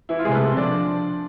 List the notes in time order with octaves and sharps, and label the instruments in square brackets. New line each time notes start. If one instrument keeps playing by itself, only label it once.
[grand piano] E3 E4
F4
[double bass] C3 [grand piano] G#3 G#4
[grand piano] B4
A3 A4
C4 C5
[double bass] F3 [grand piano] D4 D5